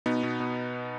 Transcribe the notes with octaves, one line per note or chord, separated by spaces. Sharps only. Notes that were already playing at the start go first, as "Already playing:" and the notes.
B2 B3 D#4
B2
B2